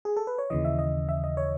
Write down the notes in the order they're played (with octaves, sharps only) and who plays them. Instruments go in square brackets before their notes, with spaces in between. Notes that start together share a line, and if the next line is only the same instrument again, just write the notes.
[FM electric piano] G#4
A4
B4
C#5
D#2 C#3 E3 D#5
E5
D#5
E5
D#5
C#5